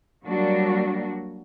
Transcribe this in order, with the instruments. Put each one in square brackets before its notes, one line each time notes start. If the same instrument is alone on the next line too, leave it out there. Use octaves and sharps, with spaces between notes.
[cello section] F#3 G3 A#3 D4 F#4